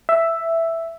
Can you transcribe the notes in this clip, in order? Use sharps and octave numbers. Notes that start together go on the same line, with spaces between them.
E5